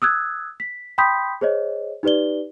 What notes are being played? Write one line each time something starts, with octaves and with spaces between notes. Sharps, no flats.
D#6 E6 F#6 G#6
B6
G5 B5 C6 D#6 G6 B6
G#4 C5 C#5 D#5
D#4 G4 B4 D5 G7